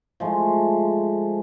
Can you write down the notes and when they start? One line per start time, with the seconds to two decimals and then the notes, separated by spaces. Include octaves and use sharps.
0.20 F3 G#3 A3